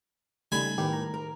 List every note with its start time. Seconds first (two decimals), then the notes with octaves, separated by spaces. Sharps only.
0.52 C#3 G3 A3 D#4 G#5 B5
0.78 A2 D#3 B3 G4 A#4
0.93 A#5
1.14 A#4